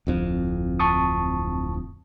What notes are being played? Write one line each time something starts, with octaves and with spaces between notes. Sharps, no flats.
D1 F2
A5 C#6 D#6